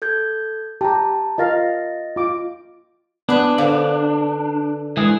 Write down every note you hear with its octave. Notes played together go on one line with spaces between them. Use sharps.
A4 G6 G#6
G4 A5 A#5
F4 A#4 D#5 F5 A6 A#6
F4 D6
B3 D4 G#4 B4
D3 B4 C5 F5
E3 G#3 G#4